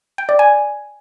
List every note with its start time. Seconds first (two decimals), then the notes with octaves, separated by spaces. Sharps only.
0.18 G5
0.29 D5
0.39 G#5